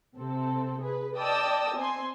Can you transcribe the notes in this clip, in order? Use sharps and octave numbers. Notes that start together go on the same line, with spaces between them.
C3 C4 A4
G#4 B4
D5 D#5 G5 A5 D#6 E6
C4 G#5 C6